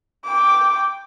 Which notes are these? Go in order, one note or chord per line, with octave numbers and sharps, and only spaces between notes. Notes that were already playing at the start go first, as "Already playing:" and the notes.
G5 D6